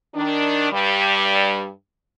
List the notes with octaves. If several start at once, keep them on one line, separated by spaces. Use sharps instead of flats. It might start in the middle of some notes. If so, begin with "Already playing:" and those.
D#3 D4
G2 G3